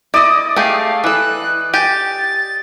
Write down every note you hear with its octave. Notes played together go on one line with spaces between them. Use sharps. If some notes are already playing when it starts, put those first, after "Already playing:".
E4 D5 D#5
A3 G4 G#4 F5
E3 A4 F#6
G4 G#5 A6